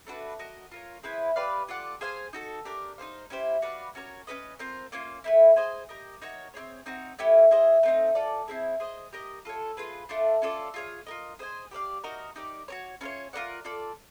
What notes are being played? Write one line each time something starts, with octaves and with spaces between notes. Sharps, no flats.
A3 D4 F#4 B4
F#4 A#4 D#5
F4 A#4 C#5
C4 E4 G#4 B4
G4 B4 D5 F5
F4 A4 D5 F#5
G#4 C5 F5 G#5
D#4 F#4 A4
D4 G4 A#4
D#4 G#4 C5 F5
C#4 E4 G4 C5
F#4 B4 D5 F5
C#4 F#4 A#4 C#5
C#4 F#4 B4 D#5
C4 F4 A#4
A#3 C#4 F4
A3 C4 E4
G#4 C5 D#5 G#5
G4 A#4 D#5
D#4 F#4 A#4 C#5
C4 D#4 G#4 C#5
C4 D#4 F#4
A3 C#4 E4 G4
E4 G#4 C5 D#5
A3 C4 D#4
F4 A4 D5
C4 E4 G#4
G#4 C5 D#5
G4 A#4 D#5
F4 A4 C#5
F4 G#4 B4
A3 D4 F4
C#4 F4 A4 D5
F4 G#4 C#5
F4 A#4 D#5
G#4 C5 D#5 G#5
G4 B4 D5 F5
D#4 F#4 A#4 D#5
D#4 G4 A#4 D5
F#4 A#4 C#5
C#4 F4 A#4 C#5
F4 A#4 D5 F#5
F4 A4 D5